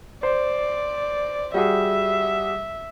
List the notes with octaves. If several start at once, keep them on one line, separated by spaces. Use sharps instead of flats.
C5 D5
G3 F#4 G#4 E5